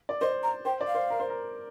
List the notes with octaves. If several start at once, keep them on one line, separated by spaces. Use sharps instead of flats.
D5
C5 D#5
A#5
C5 G5
D5
F5
C5
A#4
C5
A#4